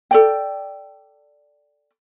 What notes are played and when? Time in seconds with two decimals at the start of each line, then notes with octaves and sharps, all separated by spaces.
0.11 A4 D5 G5